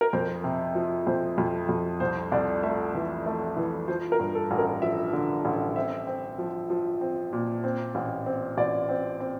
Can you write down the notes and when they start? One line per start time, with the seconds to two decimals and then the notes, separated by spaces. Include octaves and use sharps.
0.01 A#4
0.13 F2 C5
0.44 C3
0.75 F3
1.07 F2 C5
1.38 F2
1.69 F2
2.00 C2 C5
2.31 C2 D5
2.63 A3 E5
2.94 E3
3.26 A3
3.57 E3
3.88 F3 C5
4.12 A#4
4.19 G2
4.35 A4
4.51 A1
4.58 A#4
4.82 F3 E5
5.13 D3
5.45 A1
5.76 C4 E5
6.07 C4
6.38 F3
6.70 F3
7.01 C4
7.33 A#2
7.64 C4
7.95 A1
8.26 C4
8.57 A1 D5
8.89 C4
9.20 C4